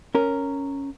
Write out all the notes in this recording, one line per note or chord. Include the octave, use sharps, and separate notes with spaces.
C#4 A#4